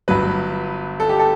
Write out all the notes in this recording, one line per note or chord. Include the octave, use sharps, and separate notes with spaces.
G1 G2 F#3 B4
A4
G4
A4